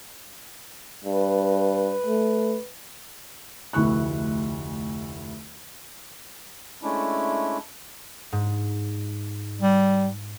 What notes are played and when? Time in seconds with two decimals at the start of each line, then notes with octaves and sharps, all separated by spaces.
1.05 G2 B4
2.06 A3
3.73 F1 D2 E4 C#6 F#6
6.83 G#3 A3 C#4 D4 E4
8.32 G#2
9.61 G3